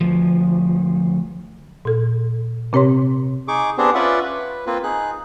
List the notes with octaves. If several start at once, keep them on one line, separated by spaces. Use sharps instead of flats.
D2 F3
A#2 A4
C3 C4 G4 C#5 C6
D#4 G#4 C#6 D6
B3 C4 D4 G4 G#4 C5
C#4 F4 B4 D5 E5 F#5
B4
A#3 C4 F4 B4
D#4 G#4 F#6